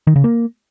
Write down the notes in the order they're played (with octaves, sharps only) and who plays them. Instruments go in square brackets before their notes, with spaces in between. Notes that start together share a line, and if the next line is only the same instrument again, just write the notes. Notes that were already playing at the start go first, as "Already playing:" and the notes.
[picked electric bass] D#3
C#3
A#3